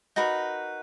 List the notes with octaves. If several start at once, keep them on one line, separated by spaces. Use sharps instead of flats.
D#4 F#4 A#4 B4